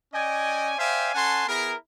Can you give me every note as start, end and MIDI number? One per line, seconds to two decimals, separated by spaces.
0.13 0.75 61
0.13 0.75 74
0.13 0.75 75
0.13 0.75 79
0.13 0.75 80
0.79 1.13 72
0.79 1.13 74
0.79 1.13 76
0.79 1.13 77
0.79 1.13 79
0.79 1.13 80
1.15 1.46 61
1.15 1.46 69
1.15 1.46 78
1.15 1.46 80
1.15 1.46 81
1.15 1.46 84
1.48 1.75 59
1.48 1.75 64
1.48 1.75 68
1.48 1.75 70